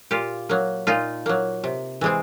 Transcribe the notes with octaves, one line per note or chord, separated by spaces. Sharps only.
A#2 F4 G4
F#3 A#3
A#2 D#4 F4
F#3 A#3
C3
E3 G#3 C4